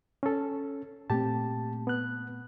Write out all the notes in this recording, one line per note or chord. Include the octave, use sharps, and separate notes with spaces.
C#4 A4
A#2 A3 C4 G4 A5
B3 F#6